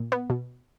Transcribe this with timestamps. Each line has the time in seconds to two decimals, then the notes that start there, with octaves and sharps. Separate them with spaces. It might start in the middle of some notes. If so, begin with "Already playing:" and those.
Already playing: A#2
0.12 B3
0.30 B2